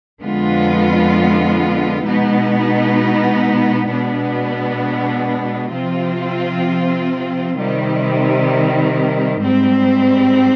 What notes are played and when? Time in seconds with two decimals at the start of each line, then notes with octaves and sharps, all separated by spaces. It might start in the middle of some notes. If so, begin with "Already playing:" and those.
0.21 F2 D3 G#3 B3 F4
2.05 B2 G#3 B3 D#4
3.89 B2 G#3 B3 D4
5.74 C3 F3 C4 F4
7.58 C3 D#3 G3
9.42 G#2 G3 C4